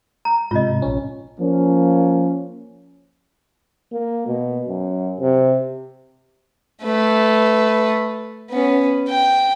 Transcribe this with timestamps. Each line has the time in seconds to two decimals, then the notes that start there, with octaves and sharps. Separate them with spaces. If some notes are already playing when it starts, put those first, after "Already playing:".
0.25 A#5
0.51 G#2 C3 F4 D#5
0.82 A#1 C#4
1.38 F3 A#3 C#4
3.92 A#3
4.27 B2
4.68 F#2
5.20 C3
6.83 A3 B4
8.50 B3 C#4
9.09 G5